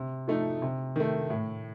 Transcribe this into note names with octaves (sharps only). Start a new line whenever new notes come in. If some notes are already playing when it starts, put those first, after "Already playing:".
Already playing: C3
F3 A3 D#4
C3
D#3 A3
A2